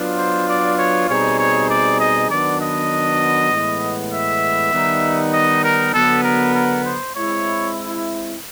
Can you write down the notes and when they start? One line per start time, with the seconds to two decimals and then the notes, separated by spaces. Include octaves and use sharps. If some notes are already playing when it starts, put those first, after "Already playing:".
Already playing: F#3 B3 D4 F4
0.18 C5
0.48 D5
0.78 C#5
1.09 B2 G3 C4 D#4 G#4 C#5
1.39 C#5
1.70 D5
2.00 D#5
2.30 D#3 F#3 B3 D4 D5
2.61 D#5
3.51 A2 E3 G#3 B3
4.12 E5
4.72 D#3 G3 B3 D#4
5.33 D#5
5.64 A#4
5.94 D3 F#3 B3 A4
6.23 A#4
6.54 A#4
6.85 C5
7.15 G#3 C4 E4 C#5